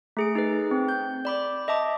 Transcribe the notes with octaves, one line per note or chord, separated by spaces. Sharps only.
A3 G#4 D7
D#4 G#4 B4
C4
G6
D5 B5 D6
D#5 E5 A5 D6